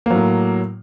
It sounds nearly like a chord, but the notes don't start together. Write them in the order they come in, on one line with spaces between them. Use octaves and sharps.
A#3 F#3 A2